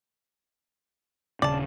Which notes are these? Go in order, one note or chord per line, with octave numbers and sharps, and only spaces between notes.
D#1 C#3 C#4 D5 A5